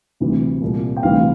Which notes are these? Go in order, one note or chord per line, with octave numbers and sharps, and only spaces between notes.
D2 C3 E3 G3
C2 A#2 G3
G5
D2 C3 E3 G3 F5